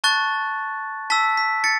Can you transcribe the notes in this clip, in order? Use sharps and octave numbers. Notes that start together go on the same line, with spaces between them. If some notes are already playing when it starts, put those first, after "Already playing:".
A5 C#6 F#6 A6
A5 E6 B6
B6
A6 C#7